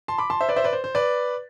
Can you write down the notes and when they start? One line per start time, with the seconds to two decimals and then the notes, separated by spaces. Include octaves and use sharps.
0.08 A5 C6
0.18 B5 D6
0.30 A5 C6
0.40 C5 E5
0.49 B4 D5
0.56 C5 E5
0.64 B4 D5
0.73 C5
0.84 C5
0.95 B4 D5